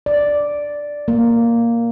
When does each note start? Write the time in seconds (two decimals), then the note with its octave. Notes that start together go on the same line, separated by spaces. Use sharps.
0.06 D5
1.08 A#3